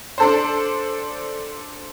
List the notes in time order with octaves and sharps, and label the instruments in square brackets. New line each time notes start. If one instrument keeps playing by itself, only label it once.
[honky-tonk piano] D4 A4 C5